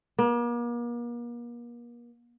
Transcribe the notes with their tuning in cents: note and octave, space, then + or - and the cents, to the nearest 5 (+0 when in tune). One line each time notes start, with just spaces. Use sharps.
A#3 +40